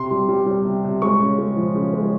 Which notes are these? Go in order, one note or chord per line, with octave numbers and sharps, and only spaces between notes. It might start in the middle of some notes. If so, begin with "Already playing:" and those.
Already playing: C3 C6
G3
G3
G3
C3
C3
G#3 C#6
C#3
G#3
F3
C#3
G#3